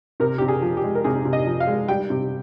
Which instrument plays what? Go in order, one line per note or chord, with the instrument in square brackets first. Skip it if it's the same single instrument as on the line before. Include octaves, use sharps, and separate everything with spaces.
[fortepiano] C3 A#4
C3 G4
G#4
F3
G4
G#3
A#4
C3 G#4
C3
D#5
F3
F5
G#3
G3 G5
C3